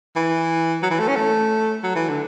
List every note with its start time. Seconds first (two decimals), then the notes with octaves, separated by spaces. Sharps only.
0.16 E3
0.83 F#3
0.90 E3
0.99 A3
1.08 C#4
1.16 A3
1.83 F#3
1.95 E3
2.09 D3